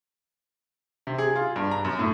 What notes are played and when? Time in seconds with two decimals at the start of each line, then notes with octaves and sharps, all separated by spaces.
1.07 C3
1.18 G#4
1.36 F4
1.56 G2
1.71 A#5
1.85 F#2
1.99 A2